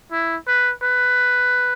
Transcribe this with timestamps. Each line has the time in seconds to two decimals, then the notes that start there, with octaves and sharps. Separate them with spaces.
0.12 E4
0.47 B4
0.83 B4